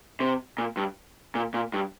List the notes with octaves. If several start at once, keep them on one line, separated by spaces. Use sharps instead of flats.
C3
A#2
G2
A#2
A#2
G2